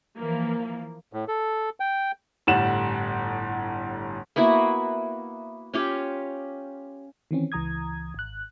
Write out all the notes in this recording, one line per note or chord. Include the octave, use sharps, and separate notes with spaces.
E3 F3 A#3
A2
A4
G5
G1 A2 G3 F#5 E7 F#7
A#3 B3 E4 F#4
C#4 F4 G4 C#5
D#3 E3 C4 C#4
C#2 E3 A#5 D#6 G#6
G#1 F#6